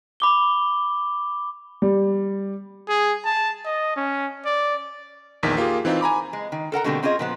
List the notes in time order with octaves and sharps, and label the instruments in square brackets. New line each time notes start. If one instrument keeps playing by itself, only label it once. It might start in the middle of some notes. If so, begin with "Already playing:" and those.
[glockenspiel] B5 D6 G7
[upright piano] G3
[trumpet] G#4
A5
D#5
C#4
D5
[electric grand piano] A#1 E2 D#3 B6
A#3 F4 G4 G#4
E3 C4 D#4 F4
G#5 A#5 B5 D6
[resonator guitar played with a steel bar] G#3
D#3
A4 A#4 F#5 A#5
B2 D3 G3 A3 A#3 C4
C4 C#4 F4 G#4 D#5
A#2 F3 B3